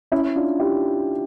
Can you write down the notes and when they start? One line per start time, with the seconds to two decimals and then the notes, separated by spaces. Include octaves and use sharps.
0.12 C#4 E4
0.36 D4 F4
0.60 E4 G4